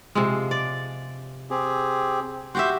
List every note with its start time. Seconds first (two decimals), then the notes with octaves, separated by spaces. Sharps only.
0.15 C3 F3 G#3
0.51 D5
1.50 C4 G4 G#4
2.55 F#4 G4 E5 C6 G6